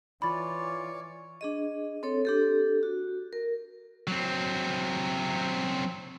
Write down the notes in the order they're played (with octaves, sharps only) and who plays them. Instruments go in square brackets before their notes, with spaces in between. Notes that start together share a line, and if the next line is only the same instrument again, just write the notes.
[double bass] E3 [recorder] F4 [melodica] C#5 D5 [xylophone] B5 A6
[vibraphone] D4 G#4 D#5
C4 A4 C#5
D4 G4 A4
F#4
A#4
[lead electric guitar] F#3 C4